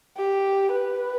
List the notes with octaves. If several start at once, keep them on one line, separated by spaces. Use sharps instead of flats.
G4
B4